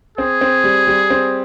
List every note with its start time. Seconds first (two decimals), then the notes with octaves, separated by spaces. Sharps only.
0.18 C4 G#4
0.41 C4
0.64 G3
0.87 G3
1.10 C4